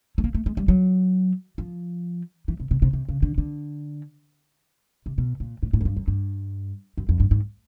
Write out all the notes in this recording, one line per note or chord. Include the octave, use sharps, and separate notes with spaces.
A3
A#3
A3
G#3
G3
F#3
F3
E3
C3
C3
C3
C3
C#3
D3
D3
C3
B2
A#2
A2
A2
F#2
G2
F#2
G2
F#2
F2
G2
G#2